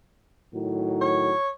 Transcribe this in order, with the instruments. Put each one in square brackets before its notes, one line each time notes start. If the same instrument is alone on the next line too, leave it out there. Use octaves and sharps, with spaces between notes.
[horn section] A2 D#3 F#3
[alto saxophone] C#5